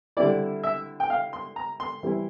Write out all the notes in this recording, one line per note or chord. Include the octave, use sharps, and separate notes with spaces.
D3 G3 C4 E4 D5
E5
G5
F5
C6
A#5
C6
E3 G3 C4 E4